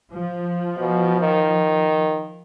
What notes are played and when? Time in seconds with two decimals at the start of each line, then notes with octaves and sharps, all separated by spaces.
0.13 F3
0.78 B2
1.20 D#3